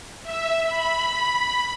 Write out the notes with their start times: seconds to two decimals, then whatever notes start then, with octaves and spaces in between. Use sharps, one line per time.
0.23 E5
0.67 B5